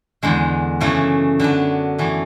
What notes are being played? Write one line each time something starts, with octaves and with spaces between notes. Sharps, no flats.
E2 D3 G#3
F#2 C#3 E3 A3 D4
D3 F#3 B3 D4
F#2 E3 A3